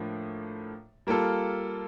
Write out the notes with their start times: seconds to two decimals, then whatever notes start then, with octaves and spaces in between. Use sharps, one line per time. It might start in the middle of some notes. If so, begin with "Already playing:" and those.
Already playing: A2 F3 A#3 D4
1.07 G3 A#3 F4 A4